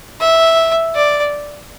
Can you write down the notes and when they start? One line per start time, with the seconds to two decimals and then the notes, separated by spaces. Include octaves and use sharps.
0.20 E5
0.95 D5